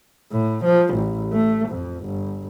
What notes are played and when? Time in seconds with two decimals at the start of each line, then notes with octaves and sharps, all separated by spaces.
0.32 A2
0.65 F3
0.95 A1
1.33 A3
1.69 F2
2.05 G1